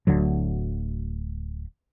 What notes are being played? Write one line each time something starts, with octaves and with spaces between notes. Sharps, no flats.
D1 D2 D3 F#3